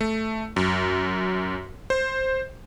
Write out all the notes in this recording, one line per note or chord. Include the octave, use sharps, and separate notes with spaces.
A3
F#2
C5